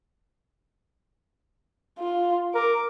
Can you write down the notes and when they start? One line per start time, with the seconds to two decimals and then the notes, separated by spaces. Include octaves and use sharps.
1.99 F4
2.54 A#4 D6